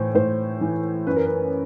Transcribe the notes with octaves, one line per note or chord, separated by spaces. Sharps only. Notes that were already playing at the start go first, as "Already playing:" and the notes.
Already playing: A2 E3 C5
A2 C5
E3
F#2 B4
A#4
B4